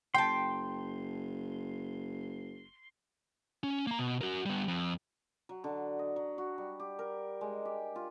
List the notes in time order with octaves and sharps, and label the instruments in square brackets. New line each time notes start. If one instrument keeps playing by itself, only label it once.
[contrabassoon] F#1 [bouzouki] G5 A5 [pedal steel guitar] C6
[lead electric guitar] C#4
A#3 A#5
B2
F#4 A#4
G3 B3
F2
[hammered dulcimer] F#3
D3
D#5
F#3
F#4
G3
G4
A#4
G#3
G4
F4